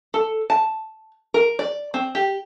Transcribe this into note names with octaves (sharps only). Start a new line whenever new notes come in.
A4
A5
A#4
D5
C4
G4